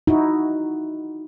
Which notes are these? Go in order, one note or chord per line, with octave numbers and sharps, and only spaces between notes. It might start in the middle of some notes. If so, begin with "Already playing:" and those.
D#4 E4 F#4